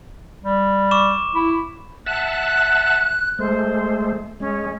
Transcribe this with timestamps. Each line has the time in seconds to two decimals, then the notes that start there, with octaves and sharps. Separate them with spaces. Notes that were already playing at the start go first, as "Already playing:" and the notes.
0.43 G3
0.91 C#6 D6 E7
1.35 E4
2.06 E5 F#5 A5 F#6
3.39 G#3 A3 C5
4.40 G#3 C#4